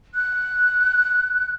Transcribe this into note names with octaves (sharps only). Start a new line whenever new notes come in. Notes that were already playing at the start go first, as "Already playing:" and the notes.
F#6